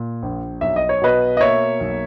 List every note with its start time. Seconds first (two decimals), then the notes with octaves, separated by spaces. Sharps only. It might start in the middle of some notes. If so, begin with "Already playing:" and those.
Already playing: A#2
0.22 A#1
0.61 B1 E5
0.76 D#5
0.89 C#5
1.01 B2 B4 D#5
1.37 D#5
1.40 A#3 C#5 E5
1.80 B1